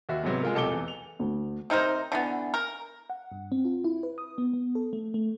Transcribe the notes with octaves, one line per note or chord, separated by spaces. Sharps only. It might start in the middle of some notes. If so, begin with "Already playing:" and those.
D#2 F#4 E5
G#2 C3 F#3 B3
G#3 F4 A#4
F1 B1 A4 D6 G7
E2
F7
D2
C3 D#4 A#4 C5
D3 E3 B3
A#4
F#5
G2
C4
F4
E4
B4
D#6
B3
B3
A4
A3
A3